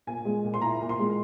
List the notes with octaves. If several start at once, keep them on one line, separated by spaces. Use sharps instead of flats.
A#2 G#5
G#3
A#2
C6
E4 A#5
A#2
C6
G#3